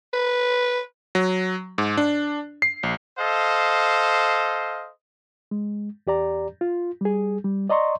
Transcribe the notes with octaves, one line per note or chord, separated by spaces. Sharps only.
B4
F#3
G#2
D4
C7
A#1
A4 C5 D#5 F5
G#3
E2 G4 D5 A#5
F4
G3 G#4
G3
D5 D#5 A#5 C6 C#6